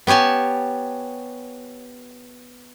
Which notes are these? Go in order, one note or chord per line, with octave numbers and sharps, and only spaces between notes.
B3 G4 C#5 G#5 A5